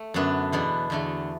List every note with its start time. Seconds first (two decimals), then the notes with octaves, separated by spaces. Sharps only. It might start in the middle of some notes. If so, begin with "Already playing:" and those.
Already playing: A3
0.14 F#2 D3 B3 D4
0.52 E2 B2 B3 D4
0.90 E2 D3 A3 D4